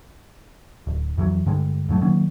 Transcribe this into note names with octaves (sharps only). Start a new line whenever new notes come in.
D1
F2 E3 F#3
G2 D3 G3 G#3
F2 A2 F#3 A3
D#3 F#3 A#3 C#4